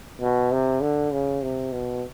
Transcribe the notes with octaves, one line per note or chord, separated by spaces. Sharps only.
B2
C3
D3
C#3
C3
B2